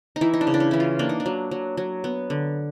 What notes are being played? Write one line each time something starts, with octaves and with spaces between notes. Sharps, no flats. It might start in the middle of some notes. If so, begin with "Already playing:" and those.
D#4
E3 E4
D#4
D4
C#3
D4
C#4
E3 E4
F4
A#3 D4
D#4
D4
F#3
F#3
F#3
B3
D3